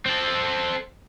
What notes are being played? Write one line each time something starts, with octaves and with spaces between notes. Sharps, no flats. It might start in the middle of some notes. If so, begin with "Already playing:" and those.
C4 A4